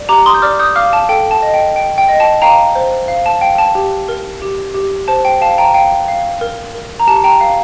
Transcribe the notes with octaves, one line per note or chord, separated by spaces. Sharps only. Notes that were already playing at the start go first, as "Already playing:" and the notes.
Already playing: D5
G4 A#5 D6
C6 D#6
G6
D5 D6 F6
D#6 G6
F5 D6 F6
A5
A4 G5
A5
D#5
G5
G5
G5
D#5
A5
F5 G5 A#5
C5
F5
A5
F5 G5
A5
G4
A#4
G4
G4
C5 A5
G5
F5 A5
G5 A#5
F5 G5
F5
A#4
A#4
A#5
G4 A5
G5 A#5
F5